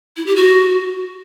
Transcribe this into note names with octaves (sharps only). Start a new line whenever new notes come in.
E4
G4
F#4